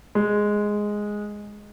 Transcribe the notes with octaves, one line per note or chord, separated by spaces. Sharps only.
G#3